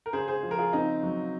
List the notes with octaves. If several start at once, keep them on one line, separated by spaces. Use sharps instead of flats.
A#4
C#3 G#4 C5
G#4 C5
F3
A#4
F4 G#4
C#3 C4 D#4
F#3